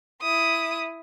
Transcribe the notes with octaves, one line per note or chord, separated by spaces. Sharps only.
E4 D#6